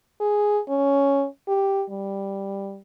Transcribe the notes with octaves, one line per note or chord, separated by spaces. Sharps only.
G#4
C#4
G4
G3